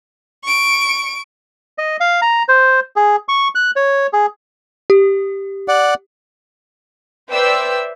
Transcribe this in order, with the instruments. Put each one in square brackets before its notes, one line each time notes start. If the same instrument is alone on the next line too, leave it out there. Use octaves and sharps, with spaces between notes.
[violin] C#6 D7
[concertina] D#5
F5
A#5
C5
G#4
C#6
F#6
C#5
G#4
[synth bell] G4
[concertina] D5 F#5
[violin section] B4 C5 D5 E5 G5 E6